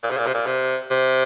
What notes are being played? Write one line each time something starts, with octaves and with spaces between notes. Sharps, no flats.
A#2
C3
A#2
C3
A#2
C3
C3